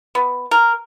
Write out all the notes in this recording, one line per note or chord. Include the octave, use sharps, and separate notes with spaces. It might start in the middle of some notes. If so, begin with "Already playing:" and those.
B3
A#4